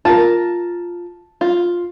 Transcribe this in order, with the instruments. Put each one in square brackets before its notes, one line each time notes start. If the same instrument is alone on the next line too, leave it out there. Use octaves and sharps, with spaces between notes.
[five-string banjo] F4 A#4 [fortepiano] A5
[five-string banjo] F4